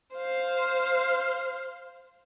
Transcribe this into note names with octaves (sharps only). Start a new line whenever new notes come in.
C5 F5